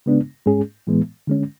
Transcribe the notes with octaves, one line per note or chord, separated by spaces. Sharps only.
C#3 G#3 B3 D4
G#2 G#3 C#4 G#4
A2 E3 G#3 B3
D3 G#3 C#4